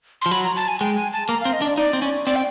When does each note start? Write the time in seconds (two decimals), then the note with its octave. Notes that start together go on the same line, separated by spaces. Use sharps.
0.22 F3 C6
0.31 F#3 B5
0.44 A#5
0.56 A5
0.68 G#5
0.80 G#3 G5
0.96 G#5
1.13 A5
1.29 A#3 A#5
1.41 F5
1.45 C4
1.53 D#5
1.62 D4
1.65 D5
1.78 D#4 D5
1.93 C4
2.02 C#4
2.27 C4 D5
2.36 G5